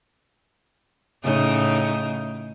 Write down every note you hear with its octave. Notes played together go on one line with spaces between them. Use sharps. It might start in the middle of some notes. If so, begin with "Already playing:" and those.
A2 C#3 D#4